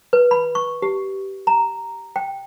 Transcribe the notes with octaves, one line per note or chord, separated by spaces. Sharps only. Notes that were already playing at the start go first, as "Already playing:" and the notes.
B4
B5
C#6
G4
A#5
G5